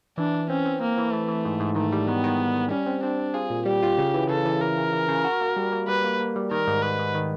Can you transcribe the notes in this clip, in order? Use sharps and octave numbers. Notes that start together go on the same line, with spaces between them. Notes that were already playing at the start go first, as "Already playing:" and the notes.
E3 D4
E3
C4 C#4
C4
A#3 C4
E3
E3 A3
E3
G#2
G#2
D#3 A3
G3
D#3 B3
D#3
D#3
D#3
G3 C#4
C4
C4 D4
C4
F4 G#4
A#2
G3 G4
F4
C#3
E3
C#3 A4
E3
E3 A#4
C#3
E3
C#3
F#4
A#3
G3
A#3
G3 B4
A#3
A#3
G3
D#3 A#4
G#2
G#2 B4
G#2
D#3